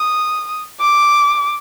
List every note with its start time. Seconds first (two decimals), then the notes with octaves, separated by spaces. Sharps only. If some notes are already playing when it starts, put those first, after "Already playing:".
Already playing: D#6
0.80 D6